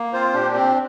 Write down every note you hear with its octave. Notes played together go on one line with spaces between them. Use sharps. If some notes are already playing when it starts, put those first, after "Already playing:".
Already playing: A#3
C4 F4 C5
A#2 D4 G4
C4